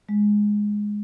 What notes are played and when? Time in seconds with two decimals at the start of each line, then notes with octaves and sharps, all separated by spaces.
0.09 G#3